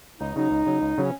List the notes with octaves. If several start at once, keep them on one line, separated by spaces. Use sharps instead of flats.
C#2 D#4
C#3 F#3 D#4
C#2
C#3 F#3
C#2
C#3 F#3 C#4